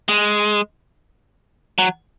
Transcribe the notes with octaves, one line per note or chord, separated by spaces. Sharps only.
G#3
F#3